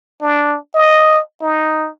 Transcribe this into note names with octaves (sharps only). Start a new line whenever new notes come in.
D4
D#5
D#4